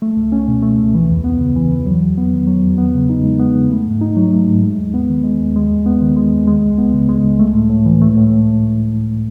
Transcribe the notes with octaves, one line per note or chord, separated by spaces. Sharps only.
A3
C#2
C#4
B2
A3
C#2
E3
E2
B3
C#3
E3
E2
F#3
E2
B3
D#3
F#3
E2
B3
C#3
D#4
G#3
B3
C#3
A3
G#2
D#4
F#3
A3
G#2
G#3
D#2
B3
D#3
G#3
D#2
G#3
D#2
B3
D#3
G#3
D#2
G#3
C#2
B3
C#3
G#3
C#2
A3
A2
A2
E3
A3
A2